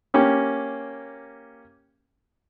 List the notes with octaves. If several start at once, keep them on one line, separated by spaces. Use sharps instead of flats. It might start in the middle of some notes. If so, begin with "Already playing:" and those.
A#3 C#4 G4